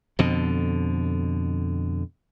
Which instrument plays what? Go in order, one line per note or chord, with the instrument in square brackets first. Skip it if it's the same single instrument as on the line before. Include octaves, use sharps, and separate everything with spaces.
[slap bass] F2 B2 D3